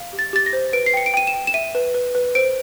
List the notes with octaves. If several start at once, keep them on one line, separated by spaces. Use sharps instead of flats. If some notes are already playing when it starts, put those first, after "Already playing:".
Already playing: F5
G4
A6
G4 A6
A#6
C5
B4 D7
C7
G5 C#7
D7
G5 D#7
E7
G5
E7
E5 D#7
B4
B4
B4
C5 D7